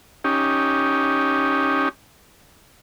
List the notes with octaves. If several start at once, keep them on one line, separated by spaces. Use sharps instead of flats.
C#4 D#4 G4